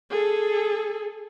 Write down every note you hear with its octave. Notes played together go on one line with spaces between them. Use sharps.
G#4 A4